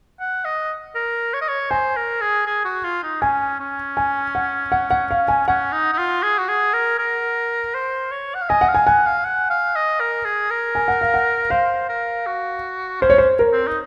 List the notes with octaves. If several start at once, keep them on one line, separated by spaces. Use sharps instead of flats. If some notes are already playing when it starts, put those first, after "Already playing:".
F#5
D#5
A#4
C#5
D#5
C#5
C5 G#5
A#4
G#4
G#4
F#4
F4
D#4
C#4 G#5
C#4
G#5
F#5
F#5
F#5
F5
G#5
C#4 F#5
D#4
D#4
F4
G#4
F#4
G#4
A#4
A#4
C5
C#5
F#5
F5
D#5 G#5
F#5
F5
G#5
F#5 G#5
F5
F#5
F5
D#5
A#4
G#4
A#4
G#5
F#5
F5
F#5
C5 F5
A#4
F#4
C#4 C5
C#5
C5
A#4
C4
D#4